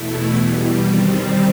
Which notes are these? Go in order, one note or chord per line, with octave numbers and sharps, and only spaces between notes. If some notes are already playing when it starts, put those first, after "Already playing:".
Already playing: E2 B2 A3 E4
E2 B2 G3
D#3 G3 C4